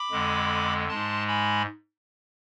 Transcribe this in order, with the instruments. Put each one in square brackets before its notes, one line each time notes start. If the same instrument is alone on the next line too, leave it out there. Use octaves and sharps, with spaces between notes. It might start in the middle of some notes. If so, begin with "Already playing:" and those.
Already playing: [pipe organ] B5 D6
F2 D3 G#3
G#2 G#3 A5 C6
G#5 B5